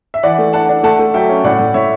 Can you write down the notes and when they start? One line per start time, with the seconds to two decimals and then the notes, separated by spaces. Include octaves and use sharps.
0.14 E5
0.23 E3 D5 F#5
0.38 A3
0.53 D4 F#5 A5
0.69 D4
0.83 A3 F#5 A5
0.99 A3
1.14 F#3 E5 G5
1.29 C#4
1.44 A2 D5 F#5
1.60 A2
1.74 A2 C#5 E5